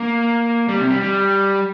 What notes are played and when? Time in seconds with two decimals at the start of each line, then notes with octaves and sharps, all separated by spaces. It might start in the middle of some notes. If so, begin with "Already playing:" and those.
Already playing: A#3
0.68 G3
0.79 C3
0.90 G3
1.01 G3